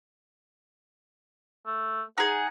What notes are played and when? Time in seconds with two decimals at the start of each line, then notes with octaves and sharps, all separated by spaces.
1.66 A3
2.18 D#4 G#4 F#5